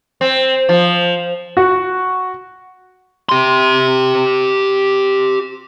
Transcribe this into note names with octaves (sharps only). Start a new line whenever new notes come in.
C4
F3
F#4
G4 C6